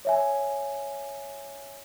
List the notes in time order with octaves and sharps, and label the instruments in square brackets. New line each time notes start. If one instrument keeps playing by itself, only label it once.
[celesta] C#5 E5 G#5